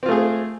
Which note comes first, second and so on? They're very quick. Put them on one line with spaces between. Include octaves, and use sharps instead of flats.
C4 F4 A3 G#4